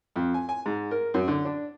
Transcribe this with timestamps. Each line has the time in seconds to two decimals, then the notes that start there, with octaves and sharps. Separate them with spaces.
0.16 F2
0.34 G#5
0.49 G#5
0.66 G#2
0.91 A#4
1.14 F#2
1.28 D3
1.45 D4